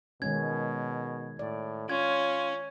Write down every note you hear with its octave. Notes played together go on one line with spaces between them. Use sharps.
B2 D#3 G#3 C#4 G#6
A2 D5
C#4 F4 G#6